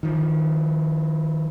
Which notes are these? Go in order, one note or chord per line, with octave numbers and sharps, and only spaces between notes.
D#3 F3